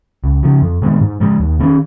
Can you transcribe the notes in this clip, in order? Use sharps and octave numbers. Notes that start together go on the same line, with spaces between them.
C#2
C#3 F3
F2
D#3 G#3 B3
G#2
F3 G#3
D#2
D#3 A#3 C#4